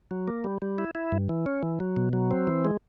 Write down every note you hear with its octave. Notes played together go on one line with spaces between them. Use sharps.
F#3
A#3
G3
G3
E4
E4
G2
E3
C#4
E3
F#3
B2
F#3
C4
E3
G#3